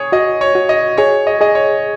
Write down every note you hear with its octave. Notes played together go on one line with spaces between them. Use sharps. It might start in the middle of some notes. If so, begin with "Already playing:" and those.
Already playing: G#4 C#5
F#4 D#5
C#5
F#4
D#5
G#4 C#5
D#5
G#4 D#5
C#5